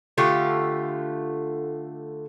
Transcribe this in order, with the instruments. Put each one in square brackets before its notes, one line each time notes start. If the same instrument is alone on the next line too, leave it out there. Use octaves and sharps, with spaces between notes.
[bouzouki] D3 A3 F4 G4